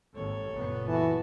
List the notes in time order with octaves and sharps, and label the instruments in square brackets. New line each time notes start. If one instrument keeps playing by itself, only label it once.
[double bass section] G#1 D#2 [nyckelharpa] A4 C#5
[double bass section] F#1 A#2 B3
[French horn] E3 [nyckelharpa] F#4 A5